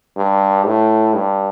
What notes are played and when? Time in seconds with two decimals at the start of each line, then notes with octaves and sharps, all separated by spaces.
0.17 G2
0.66 A2
1.14 G2